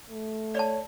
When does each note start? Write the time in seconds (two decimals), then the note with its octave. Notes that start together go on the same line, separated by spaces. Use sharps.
0.10 A3
0.55 C#5 D5 A5